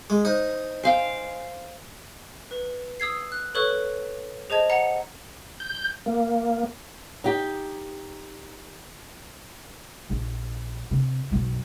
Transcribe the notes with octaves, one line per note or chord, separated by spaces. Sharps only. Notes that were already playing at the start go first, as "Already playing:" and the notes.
G#3
D#4 C5 G6
C5 F5 G5 G#5
B4
D#6 E6 G#6 C7
F#6
A4 B4 C#5 C#6 F#6
G#4 C5 D#5 A5 G#6
F#5 A#5 C#7
G6
A#3
D#4 G4
A#1
C3
B1 F#2